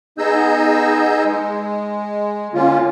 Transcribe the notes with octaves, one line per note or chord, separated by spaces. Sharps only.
B3 D#4 G#4 D#5 E6 G6
G#3
D3 A#3 C#4 F4